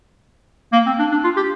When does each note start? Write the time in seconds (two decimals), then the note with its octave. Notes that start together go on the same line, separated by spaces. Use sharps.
0.72 A#3
0.86 C4
0.99 D4
1.12 D4
1.24 F4
1.37 G4